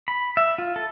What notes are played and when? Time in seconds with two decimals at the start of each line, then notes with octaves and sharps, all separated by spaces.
0.08 B5
0.37 E5
0.58 F4
0.76 A4